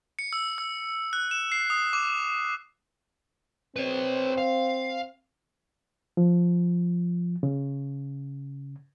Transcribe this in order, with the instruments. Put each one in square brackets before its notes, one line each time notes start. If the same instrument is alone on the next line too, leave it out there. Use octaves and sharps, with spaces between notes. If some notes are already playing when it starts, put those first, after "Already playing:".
[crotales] C#7
E6
E6
F#6
E7
C7
D#6
D6
[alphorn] C4 [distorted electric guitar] B4 C#5
[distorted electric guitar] F5
[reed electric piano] F3
C#3